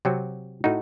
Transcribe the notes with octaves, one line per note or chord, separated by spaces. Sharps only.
C3 F#3 C4 F#4
A2 A3 D#4 F#4